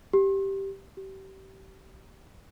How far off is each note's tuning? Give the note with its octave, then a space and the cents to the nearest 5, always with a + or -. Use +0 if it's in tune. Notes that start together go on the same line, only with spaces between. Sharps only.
G4 -5
G4 -30